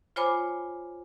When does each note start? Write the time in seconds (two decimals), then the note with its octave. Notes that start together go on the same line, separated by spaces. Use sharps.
0.16 F4 C5 C#5 G#5 B5 D6